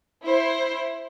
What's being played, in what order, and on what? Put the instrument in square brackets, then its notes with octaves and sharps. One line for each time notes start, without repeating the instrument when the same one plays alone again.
[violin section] E4 C5